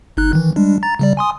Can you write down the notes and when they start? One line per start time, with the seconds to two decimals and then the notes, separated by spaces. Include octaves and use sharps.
0.17 G1 D#4 F#6
0.33 D#3 E3
0.56 G3 G#3 D4
0.83 A#5 A6
0.99 C#3 G3 D5
1.17 G#5 C6 D#6